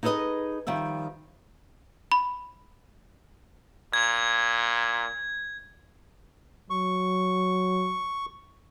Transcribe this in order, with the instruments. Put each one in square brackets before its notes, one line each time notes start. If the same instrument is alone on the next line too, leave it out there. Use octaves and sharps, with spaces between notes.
[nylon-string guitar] D#4 G#4 A4 B4 D#5
D#3 F3 G3 E5
[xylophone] B5
[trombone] A#2 [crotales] G#6
[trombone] F#3 [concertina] C#6